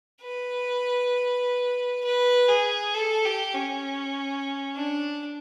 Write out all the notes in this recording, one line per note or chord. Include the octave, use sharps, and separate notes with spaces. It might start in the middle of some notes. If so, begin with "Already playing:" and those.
B4
B4
G#4
A4
G4
C#4
D4